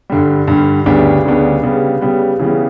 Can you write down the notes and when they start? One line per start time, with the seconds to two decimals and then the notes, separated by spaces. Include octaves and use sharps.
0.10 G2 D3 G3
0.48 G2 D3 G3
0.86 D2 C#3 G3 B3 D4
1.25 D2 C#3 G3 B3 D4
1.63 C#3 G3 B3
2.01 C#3 G3 B3
2.39 C#3 E3 G3 B3